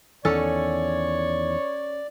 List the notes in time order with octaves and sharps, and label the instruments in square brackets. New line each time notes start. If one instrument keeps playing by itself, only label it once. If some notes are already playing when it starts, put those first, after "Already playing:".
[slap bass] E2 D#3 [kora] C#4 A4 [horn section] C#5 [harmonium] D5